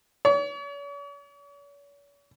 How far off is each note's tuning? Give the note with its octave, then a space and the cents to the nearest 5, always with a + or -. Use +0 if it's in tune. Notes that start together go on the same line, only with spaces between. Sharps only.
C#5 +45